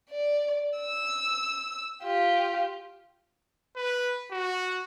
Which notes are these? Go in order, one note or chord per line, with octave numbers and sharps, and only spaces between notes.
D5
E6
F4 G4
B4
F#4